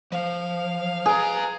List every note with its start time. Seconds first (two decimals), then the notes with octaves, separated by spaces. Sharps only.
0.12 F3 F5
1.06 G#4 B4 A#5